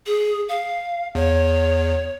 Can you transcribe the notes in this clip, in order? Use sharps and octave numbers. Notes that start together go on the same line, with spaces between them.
G#4
F5
E2 C#5